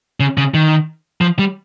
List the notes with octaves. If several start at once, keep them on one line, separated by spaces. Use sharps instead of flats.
C#3
C#3
D#3
F3
G3